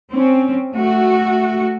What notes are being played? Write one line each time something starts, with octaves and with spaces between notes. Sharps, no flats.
C4 C#4
A3 F#4